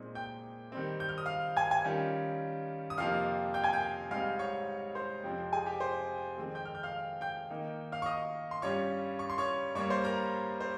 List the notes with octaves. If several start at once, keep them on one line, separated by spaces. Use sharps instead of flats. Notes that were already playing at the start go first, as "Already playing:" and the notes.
Already playing: A#2 G#3 C4 D#4
G5 G6
D#3 G3 C4
G6
F6
D#6
F5 F6
G#5 G#6
G#5 G#6
D#3 G3 C#4 F4
D#6
F2 C3 F3 A#3 D#4 F5 F6
G5 G6
G#5 G#6
G5 G6
G#2 G3 C4 D#4 F5 F6
C#5 C#6
C5 C6
F2 C3 F3 C4
G#4 G#5
G4 G5
C5 C6
F2 D#3 G#3 C4
G5 G6
F6
G6
F5 F6
G5 G6
D#3 A#3 D#4
F5 F6
C#6
D#5 D#6
C6
G2 G3 C#4 F4 C#5 C#6
C#6
C6
C#5 C#6
G2 G3 A#3 C#5 C#6
C5 C6
A#4 A#5
C5